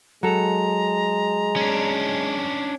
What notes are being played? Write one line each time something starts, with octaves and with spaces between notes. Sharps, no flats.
F#3 G#3 A4 A#5
C#4 D4